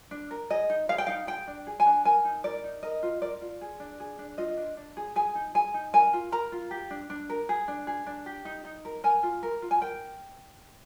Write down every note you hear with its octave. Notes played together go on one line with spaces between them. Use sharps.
D4
A#4
G#4 D#5
D#4
G#4 F5
G5
D#4 F5
G#4 G5
D4
G#4
G#5
D4
A#4 G#5
D#4
A#4 D5
D#4
A#4 D#5
F4
A#4 D5
F4
G#4
D4
G#4
D4
F4 D#5
D4
D4
G#4
G#4 G#5
D#4
G#4 G#5
D#4
A#4 G#5
F4
A#4 A#5
F4
G4
D4
D4
A#4
G#4
D4
G#4
D4
G4
D#4
D#4
A#4
A#4 G#5
F4
A#4
F4
G#5
A#4 G5